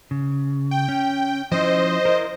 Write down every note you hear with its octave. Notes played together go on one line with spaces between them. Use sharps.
C#3
G5
C#4
F3 C#4 E4 C5 D#5
E4 A#4